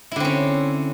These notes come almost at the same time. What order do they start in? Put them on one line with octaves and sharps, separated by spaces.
E4 D3 C4 C#4